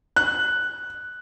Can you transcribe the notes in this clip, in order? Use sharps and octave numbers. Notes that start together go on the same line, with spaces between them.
F#6